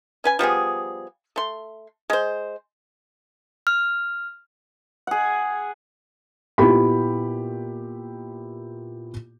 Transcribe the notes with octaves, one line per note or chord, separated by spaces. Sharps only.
C#4 B4 G#5
F3 G3 B3 G#4
A3 C6
G#3 C5
F6
G#4 F#5
A#2 B3 E4 G4 B5